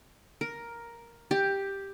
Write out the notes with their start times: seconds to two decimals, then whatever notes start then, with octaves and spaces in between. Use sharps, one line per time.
0.41 A#4
1.31 G4